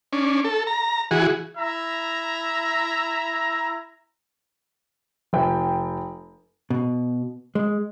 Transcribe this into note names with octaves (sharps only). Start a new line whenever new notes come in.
C#4 D4
A4
A#5
E3 F#4 G#4
E4 E5 A#5
F1 G5
B2
G#3